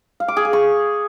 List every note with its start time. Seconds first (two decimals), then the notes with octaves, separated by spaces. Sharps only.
0.20 F5
0.28 D6
0.37 G#4
0.45 G#5
0.53 C#6